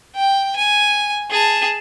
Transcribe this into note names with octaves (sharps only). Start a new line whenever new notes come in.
G5
G#5
G#4 A5